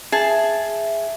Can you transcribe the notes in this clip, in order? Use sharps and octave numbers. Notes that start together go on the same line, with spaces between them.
G#4 E5 A5